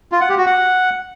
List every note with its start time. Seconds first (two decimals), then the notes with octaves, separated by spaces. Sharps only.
0.12 F4
0.21 F#5
0.29 G4
0.38 F#4
0.47 F#5